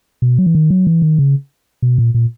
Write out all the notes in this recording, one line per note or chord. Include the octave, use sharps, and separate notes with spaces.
B2
F#3
E3
D#3
F#3
E3
D#3
C#3
B2
A#2
A#2